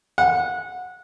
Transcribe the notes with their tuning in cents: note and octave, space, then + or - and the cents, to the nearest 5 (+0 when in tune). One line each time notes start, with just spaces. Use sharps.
F#5 -20